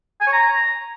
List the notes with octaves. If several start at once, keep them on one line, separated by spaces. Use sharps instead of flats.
G#5
C#5
A#5